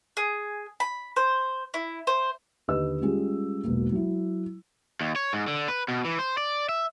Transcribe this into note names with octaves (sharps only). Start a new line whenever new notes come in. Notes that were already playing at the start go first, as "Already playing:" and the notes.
G#4
B5
C5
E4
C5
D#2 D3 B4 D#5 E6
G3 G#3 C#4 F4 G4 G#4
E1 B1 A#3
F#3 E4
D#2
C#5
G#2
D3
B4
B2
E3
C5
D5
E5